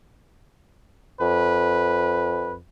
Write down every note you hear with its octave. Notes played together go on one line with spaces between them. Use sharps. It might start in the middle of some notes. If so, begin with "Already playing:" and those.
F2 B4